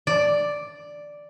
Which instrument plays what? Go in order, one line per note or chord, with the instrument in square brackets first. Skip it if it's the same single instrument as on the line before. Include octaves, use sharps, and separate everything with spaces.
[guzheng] D5